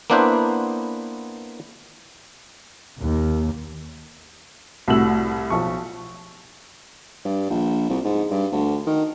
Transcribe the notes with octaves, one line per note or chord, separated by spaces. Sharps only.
A#3 B3 D4 E4 B4 C5
D#2
C2 A2 F#4 E6 F#7
B1 F3 C#6
G2
A#1
C2
G#2
G2
D2
D#3